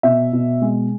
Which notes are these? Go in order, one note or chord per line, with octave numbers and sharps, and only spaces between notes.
B2 E5
B2
G#3